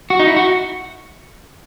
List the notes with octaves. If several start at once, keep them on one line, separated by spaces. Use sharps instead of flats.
F#4
D#4
E4
F#4